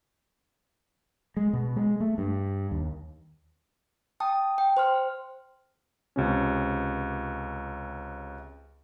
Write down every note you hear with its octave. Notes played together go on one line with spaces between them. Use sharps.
G#3
B2
G#3
A3
G2
D#2
G5 A5 D#6
G5
C5 C6 F6
C#2 C3 C#4